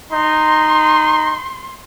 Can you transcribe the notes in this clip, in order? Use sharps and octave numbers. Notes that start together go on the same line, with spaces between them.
D#4 C6